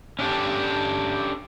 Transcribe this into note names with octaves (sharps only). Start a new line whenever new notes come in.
C#4 D4 G4 A4